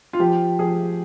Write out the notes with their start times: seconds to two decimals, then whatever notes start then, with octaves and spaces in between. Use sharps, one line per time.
0.13 F4
0.19 F3 G4
0.59 F3 G#4